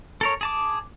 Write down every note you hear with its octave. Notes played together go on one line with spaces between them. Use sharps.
A4 A#4 C#5
G#4 A5 D6